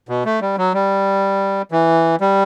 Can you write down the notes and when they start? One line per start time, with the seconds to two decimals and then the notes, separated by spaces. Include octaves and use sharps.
0.09 B2
0.25 A3
0.41 G3
0.58 F#3
0.74 G3
1.72 E3
2.21 G3